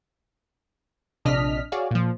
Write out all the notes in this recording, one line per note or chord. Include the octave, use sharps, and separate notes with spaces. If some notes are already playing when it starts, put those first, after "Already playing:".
A#1 C3 D4 D#5 F6 B6
F#4 G#4 C#5 D5 F5
A#2 F3